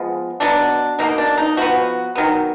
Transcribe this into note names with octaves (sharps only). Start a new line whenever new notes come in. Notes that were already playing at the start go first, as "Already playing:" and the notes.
Already playing: F3 G#3 B3
B2 F#3 B3 D4
B2 A#3 D#4
D4
D#4
F3 B3 F#4
D#3 F#3 B3